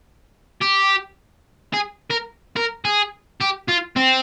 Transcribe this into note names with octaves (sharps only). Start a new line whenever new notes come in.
G4
G#4
A#4
A#4
G#4
G4
F4
C4